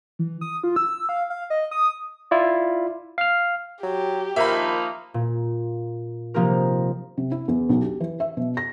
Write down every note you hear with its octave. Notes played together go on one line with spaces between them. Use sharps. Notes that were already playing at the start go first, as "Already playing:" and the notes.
E3
D#6
F4
E6
F5
F5
D#5
D#6
E4 F4 D5
F5 F6
F#3 G4
D#3 F3 A#3 D#4 E5 B5
A#2
C3 F3 A#3 D#4 G4 A#4
C3
E4
E2
B1
G4
E3
E5
B2
A#6